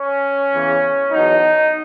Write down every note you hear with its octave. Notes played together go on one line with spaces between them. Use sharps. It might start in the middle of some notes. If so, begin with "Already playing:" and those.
Already playing: C#4
E2 C#3 E3
E2 B2 F#3 D#4